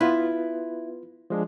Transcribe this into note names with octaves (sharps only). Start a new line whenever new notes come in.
B3 E4 F4 B4
F3 G#3 D4